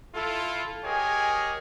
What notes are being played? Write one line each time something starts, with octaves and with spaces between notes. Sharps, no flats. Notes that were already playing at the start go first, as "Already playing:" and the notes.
E4 F4 A4
G4 G#4 A#4 C#5 D#5 G#5